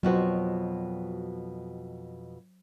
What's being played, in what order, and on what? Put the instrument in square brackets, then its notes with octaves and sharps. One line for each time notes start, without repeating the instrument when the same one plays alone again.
[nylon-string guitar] F2 B2 F#4 [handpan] F#3 C5